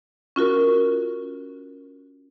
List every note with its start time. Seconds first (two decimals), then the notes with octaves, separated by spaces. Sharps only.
0.36 C#4 F4 F#4 A#4